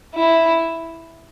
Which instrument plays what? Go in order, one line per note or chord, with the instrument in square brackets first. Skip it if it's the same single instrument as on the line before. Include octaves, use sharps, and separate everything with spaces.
[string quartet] E4